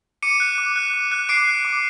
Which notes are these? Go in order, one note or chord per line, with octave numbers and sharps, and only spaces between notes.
D6 C#7 D#7
F#6
D6
F#6
D6
F#6
D6 C7 D7
F#6
D6